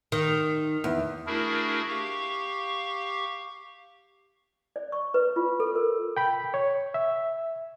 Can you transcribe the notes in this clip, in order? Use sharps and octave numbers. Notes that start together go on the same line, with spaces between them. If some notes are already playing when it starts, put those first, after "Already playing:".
D#3
E2
A3 D4 E4 F#4 G#4 A#4
G4 F5 C#6
D5
C#6
B4
F4
A4
A#4
G5 B5
C#5
E5